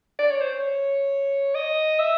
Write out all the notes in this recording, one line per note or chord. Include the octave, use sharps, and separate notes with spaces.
D5
C#5
C5
C#5
D#5
E5